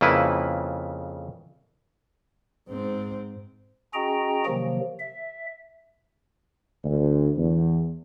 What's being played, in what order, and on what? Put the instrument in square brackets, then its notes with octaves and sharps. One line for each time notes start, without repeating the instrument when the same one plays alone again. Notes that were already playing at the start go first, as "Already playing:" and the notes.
[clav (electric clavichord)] F2 C#3 A#3 E4 B4
[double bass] G#2 C4
[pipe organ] C#4 F#4 G#4 D#5 G5 A#5
C3 D#3 F3 F#3 A#3
E5
[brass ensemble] D2
E2